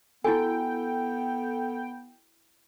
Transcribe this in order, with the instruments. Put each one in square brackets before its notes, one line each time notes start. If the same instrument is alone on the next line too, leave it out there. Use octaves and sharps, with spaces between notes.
[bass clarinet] B3 [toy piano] E4 F#4 G#5 [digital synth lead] A4 [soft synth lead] G5